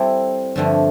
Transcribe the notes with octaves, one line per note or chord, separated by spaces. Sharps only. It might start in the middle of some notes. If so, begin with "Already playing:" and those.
Already playing: G3 C4 E4 A4
G2 D3 F3 A3